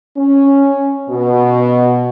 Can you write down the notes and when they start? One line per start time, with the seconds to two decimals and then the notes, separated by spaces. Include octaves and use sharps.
0.17 C#4
1.09 B2